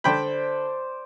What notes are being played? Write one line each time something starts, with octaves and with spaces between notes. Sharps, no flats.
D3 C5 D5 G5 B5